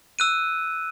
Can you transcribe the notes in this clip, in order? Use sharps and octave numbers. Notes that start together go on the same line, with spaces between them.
E6 F#6 D#7